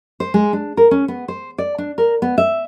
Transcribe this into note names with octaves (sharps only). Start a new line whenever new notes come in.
C5
G#3
D4
A#4
C#4
B3
C5
D5
D4
A#4
B3
E5